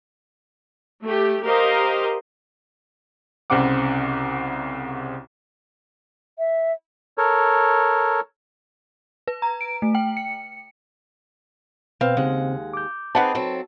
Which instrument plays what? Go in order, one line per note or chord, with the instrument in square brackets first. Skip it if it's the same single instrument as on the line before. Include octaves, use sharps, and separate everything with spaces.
[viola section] A3 G4
G4 A#4 C5 D#5 F5
[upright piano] C2 C#3 C4 F#5 D6
[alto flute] E5
[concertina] A4 A#4 C#5
[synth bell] B4
A#5
D7
A3
G5
C#7
[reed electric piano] B2 B4 [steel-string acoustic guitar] C4 [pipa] F5
[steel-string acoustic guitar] D#2 G#3 F#5 [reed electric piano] C#3 C4
[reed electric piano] D6 G6
[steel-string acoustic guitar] C4 D#4 G#4 [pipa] B4 F#5 A5
[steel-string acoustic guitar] F#3 C4 A4